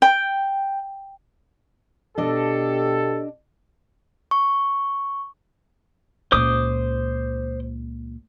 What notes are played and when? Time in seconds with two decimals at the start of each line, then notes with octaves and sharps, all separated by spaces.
0.02 G5
2.18 B2 D4 G4 A4 D#5
4.31 C#6
6.32 C#2 A#2 C5 D6 D#6